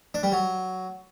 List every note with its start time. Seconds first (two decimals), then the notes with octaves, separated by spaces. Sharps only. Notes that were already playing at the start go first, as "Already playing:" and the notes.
0.14 D4
0.23 G3
0.32 F#3